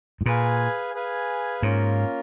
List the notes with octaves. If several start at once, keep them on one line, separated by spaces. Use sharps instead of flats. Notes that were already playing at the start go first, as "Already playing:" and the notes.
G#2
A#2 G#4 B4 F5 G#5
G#4 B4 F5 G#5
G#2 A#3 C#4 F4 A#4